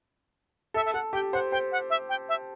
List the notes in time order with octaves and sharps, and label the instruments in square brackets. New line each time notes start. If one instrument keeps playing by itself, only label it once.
[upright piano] A4 [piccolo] E5
[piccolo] E5
[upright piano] A4 [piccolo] F#5
[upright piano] G4 [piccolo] G5
[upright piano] C5 [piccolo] F#5
[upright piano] C5 [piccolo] G5
[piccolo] F#5
E5
G5
E5